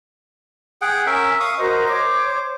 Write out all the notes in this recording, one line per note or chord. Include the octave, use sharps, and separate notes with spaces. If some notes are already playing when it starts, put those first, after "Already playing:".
G#4 F#5 G5
C#4 A#4 E5
F5 C#6 D#6
F#4 A#4 C5 D#5
C#5 D6